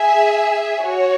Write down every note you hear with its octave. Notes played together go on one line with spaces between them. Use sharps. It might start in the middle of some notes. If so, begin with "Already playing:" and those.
Already playing: G#4 E5 G#5
F#4 C#5